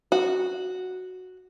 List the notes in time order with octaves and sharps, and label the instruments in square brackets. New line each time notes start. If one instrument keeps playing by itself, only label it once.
[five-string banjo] F#4